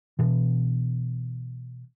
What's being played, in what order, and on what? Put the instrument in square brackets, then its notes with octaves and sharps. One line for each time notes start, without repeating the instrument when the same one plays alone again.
[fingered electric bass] B2 E3